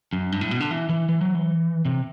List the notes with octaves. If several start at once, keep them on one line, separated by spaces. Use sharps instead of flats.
F#2
G2
A2
B2
D3
E3
E3
E3
F#3
E3
C3